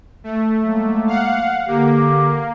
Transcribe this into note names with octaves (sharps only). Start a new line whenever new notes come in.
A3
F#3 G#3 A#3
F5 F#5
D3 A#3 G4